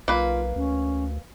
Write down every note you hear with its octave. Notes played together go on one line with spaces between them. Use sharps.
B1 A#3 F4 B4
D2 C#4